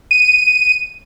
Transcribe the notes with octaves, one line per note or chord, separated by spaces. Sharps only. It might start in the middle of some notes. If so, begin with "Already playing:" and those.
D#7